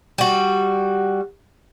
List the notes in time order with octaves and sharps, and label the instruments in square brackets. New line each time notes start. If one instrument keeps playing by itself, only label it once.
[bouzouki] G3 F#4